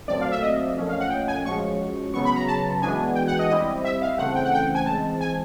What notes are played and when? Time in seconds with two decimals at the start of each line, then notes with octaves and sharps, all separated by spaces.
0.08 A#2 F#3 A3 C4 D5
0.21 F5
0.32 E5
0.42 D#5
0.76 A#2 F3 A3 C#4
0.89 F5
1.00 F#5
1.10 G5
1.28 G#5
1.45 F3 G#3 C#4 F#4 C#6
2.14 C#3 F#3 B3 C#6
2.25 B5
2.36 A#5
2.48 A5
2.81 E3 G#3 B3 D4 F#4 G#5
3.15 G5
3.28 F#5
3.39 D#5
3.49 G3 C4 E4 G4 D#5
3.85 E5
4.02 F5
4.18 C#3 E3 A3 C4 F#5
4.35 G5
4.45 F#5
4.54 G5
4.75 G#5
4.86 E3 G#3 C4 A5
5.21 G#5